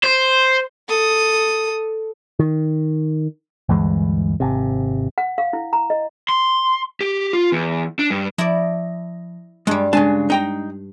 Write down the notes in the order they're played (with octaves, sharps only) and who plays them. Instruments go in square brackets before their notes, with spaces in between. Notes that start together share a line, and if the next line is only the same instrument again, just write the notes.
[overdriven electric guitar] C5
[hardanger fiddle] A4 D#6
[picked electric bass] D#3
D2 G2 E3 G#3
G#1 C3
[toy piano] F#5
F5
E4
A#5
D#5
[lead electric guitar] C6
G4
F4
E2
D4
G2
[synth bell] F3 A#6 [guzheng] E4 D5
[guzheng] G2 G3 [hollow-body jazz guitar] G#3
[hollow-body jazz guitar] C#3 G#5 A5 [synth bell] G#3 D4
[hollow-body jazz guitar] D#4 G5 A#5